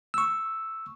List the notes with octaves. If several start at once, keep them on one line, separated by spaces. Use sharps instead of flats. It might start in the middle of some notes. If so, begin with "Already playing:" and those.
C#6 E6